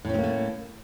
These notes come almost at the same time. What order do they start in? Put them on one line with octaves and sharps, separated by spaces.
A2 C#4 C4 A#3 A3